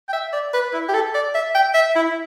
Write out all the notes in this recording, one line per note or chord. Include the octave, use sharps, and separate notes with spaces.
G5
E5
D5
B4
E4
G4
A4
D5
E5
G5
E5
E4